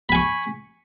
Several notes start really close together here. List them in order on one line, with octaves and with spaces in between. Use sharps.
B5 G#5 C#6